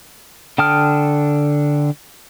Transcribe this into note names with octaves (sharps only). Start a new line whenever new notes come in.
D3 G5 A5 D#6 F6